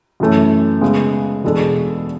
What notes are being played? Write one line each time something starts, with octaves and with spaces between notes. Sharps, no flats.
F#2 E3 A3 C#4
C#3 G#3 B3
E2 B2 G#3 D4 A4